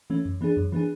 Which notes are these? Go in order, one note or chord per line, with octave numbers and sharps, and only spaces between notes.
E3 A3 C#4
F#2
E3 B3 D4 G#4
F#2
E3 B3 D4 G#4